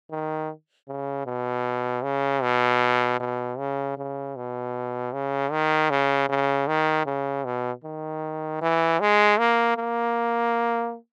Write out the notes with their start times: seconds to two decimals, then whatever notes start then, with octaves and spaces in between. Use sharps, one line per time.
0.11 D#3
0.88 C#3
1.26 B2
2.03 C#3
2.42 B2
3.20 B2
3.58 C#3
3.97 C#3
4.36 B2
5.13 C#3
5.52 D#3
5.90 C#3
6.29 C#3
6.67 D#3
7.06 C#3
7.45 B2
7.84 D#3
8.61 E3
9.00 G#3
9.38 A#3
9.77 A#3